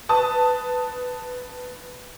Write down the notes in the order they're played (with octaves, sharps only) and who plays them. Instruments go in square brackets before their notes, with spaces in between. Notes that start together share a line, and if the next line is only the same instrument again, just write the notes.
[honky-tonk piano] B4 A5 D#6